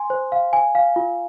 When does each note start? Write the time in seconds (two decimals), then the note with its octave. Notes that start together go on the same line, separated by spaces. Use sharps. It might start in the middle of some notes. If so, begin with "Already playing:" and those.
Already playing: G#5 C6
0.10 C5
0.32 F5
0.53 G#5
0.75 F5
0.96 F4